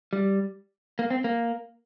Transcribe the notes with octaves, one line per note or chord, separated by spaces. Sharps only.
G3
A#3
C4
A#3